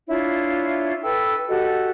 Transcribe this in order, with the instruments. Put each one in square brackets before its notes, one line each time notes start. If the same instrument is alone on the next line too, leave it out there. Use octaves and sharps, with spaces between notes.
[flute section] D4 E4 F4 C#5
A4 B4 G5 E6
F#4 G4 A4 D#5